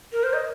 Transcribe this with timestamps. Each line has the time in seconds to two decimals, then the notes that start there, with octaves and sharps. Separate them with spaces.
0.13 A#4
0.24 C5
0.34 D#5